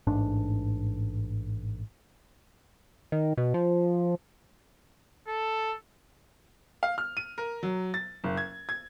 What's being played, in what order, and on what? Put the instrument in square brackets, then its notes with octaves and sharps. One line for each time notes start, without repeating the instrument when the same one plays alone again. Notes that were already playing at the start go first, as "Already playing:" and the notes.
[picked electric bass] A1 G#2 D4
[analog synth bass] D#3
B2
F3
[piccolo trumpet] A4
[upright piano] F5
F6
D#7
A#4
F#3
A6
F#1
G#6
G#6